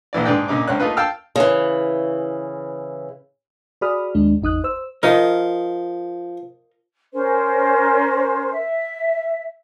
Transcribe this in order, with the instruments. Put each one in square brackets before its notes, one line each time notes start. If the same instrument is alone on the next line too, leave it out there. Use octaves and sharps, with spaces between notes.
[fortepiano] A#1 A#2 E3 D5
G#2 D3 G#4 B4 D5 G5
A#2 C#3 D#4 D6
C#2 C4 C#4 F#6
A3 A#3 D#4 F4 B4
F5 G5 A5 E6 F6
[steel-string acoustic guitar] C#3 E3
[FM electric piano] F#4 G#4 D5 B5 D#6 F6
D#2 G#3 D4
G#1 E2 D#4 D#6 F#6
C5 E6
[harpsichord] F3 [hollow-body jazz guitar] A#4 D#5
[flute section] C#4 A#4 C5
E5